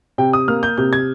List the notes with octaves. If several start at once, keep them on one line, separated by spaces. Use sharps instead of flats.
C3 G5
D#6
A#3 F6
G6
C3 G6
G#6